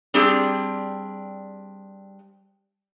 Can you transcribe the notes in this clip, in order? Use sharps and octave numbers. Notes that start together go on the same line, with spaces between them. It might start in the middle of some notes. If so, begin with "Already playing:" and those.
G3 C4 D4 G4 G#4